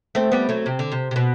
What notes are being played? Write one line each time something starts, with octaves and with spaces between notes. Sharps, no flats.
A3 C4
G3 B3
F#3 A3
C3
D3
C3
C3
B2